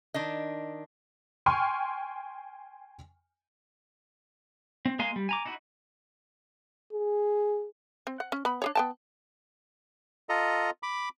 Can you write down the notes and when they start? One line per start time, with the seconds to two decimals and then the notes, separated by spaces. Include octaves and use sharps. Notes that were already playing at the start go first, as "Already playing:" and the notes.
0.14 D#3 D4 D#5
1.46 G5 G#5 C6 C#6 F6
4.86 C4
4.99 G#3 A#3 F5 G#5 C6
5.16 G3
5.29 G#5 A#5 D6
5.46 D#4 E4 F#4
6.93 G#4
8.07 C4
8.20 F#5
8.32 C#4
8.45 B3 B5
8.62 D4 G#4 C#5
8.75 B3 G5 A5
10.29 F4 A4 D#5 A#5
10.83 B5 D6